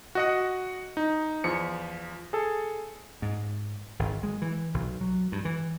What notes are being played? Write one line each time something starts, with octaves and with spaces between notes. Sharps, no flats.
F#4 D#5 F#5
D#4
E2 F3 C#7
G#4 A4
G#2
G#1
G#3
E3
B1
F#3
G2
E3